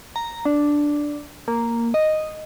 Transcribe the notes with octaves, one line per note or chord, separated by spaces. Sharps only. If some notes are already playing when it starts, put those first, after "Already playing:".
A#5
D4
A#3
D#5